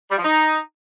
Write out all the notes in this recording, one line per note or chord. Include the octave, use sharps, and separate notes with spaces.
G3
F3
D#4